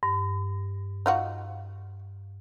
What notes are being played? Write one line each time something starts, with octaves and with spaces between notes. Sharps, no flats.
G2
D#4 F4 F#4